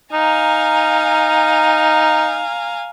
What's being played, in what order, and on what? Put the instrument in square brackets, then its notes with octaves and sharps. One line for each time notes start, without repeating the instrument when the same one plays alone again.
[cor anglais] D#4 [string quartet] F5 G#5 A#5